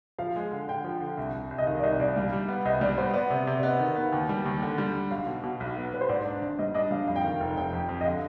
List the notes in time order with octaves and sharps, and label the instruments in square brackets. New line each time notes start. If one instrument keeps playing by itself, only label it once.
[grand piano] F3 [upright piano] F5
[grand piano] G#3
D3
[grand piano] D3 [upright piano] G5
[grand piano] F3
D3
C2
C2
C2
[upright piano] D#5
[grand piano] D#3 [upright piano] F5
[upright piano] D5
[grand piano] C2 [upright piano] D#5
[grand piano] C2 [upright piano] D5
[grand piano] G3 [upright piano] F5
[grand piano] G3
B3
[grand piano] C2 [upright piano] D#5
[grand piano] G3 [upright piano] D5
[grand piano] B3 [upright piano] C5
[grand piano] B3 [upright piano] D5
[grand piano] C3
C3
[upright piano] D5
[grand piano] B3 [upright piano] D#5
[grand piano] D#3
B3
[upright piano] F5
[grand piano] D#2 [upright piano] G5
[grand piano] G3
D#2
D3
G3
D3
[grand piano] B1 [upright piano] F5
[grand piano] B2
B2
B1
B3
[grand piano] B3 [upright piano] B4
[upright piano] C5
[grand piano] G#2 [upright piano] D5
[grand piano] D4
G#1
[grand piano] G3 [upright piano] D#5
[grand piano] D4 [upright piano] D#5
[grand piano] G3 [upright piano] F5
[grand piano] F2 [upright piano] F5
[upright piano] G5
[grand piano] D#3 [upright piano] F5
[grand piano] F1
[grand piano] F1 [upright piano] G5
[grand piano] F2
F2
[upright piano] D#5
[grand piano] D3 [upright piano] F5